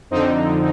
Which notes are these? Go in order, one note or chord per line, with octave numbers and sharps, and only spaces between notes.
F2 D3 C4 D#4